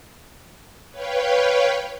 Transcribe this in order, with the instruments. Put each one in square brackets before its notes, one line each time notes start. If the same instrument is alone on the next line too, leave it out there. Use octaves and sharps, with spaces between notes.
[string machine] B4 C#5 F5 G5